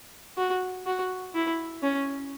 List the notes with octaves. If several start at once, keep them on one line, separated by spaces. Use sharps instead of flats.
F#4
F#4
E4
C#4